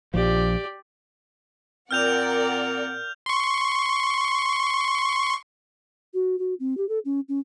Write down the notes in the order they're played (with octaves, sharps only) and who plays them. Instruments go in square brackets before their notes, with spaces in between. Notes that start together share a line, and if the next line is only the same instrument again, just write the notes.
[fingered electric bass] A#1 F3 [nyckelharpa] G4 D5
[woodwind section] A#2 C4 [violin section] A#4 D5 F#5 [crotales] F6 G6 F7
[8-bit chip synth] C6 C#6
[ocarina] F#4
F#4
C4
G4
A4
C#4
C#4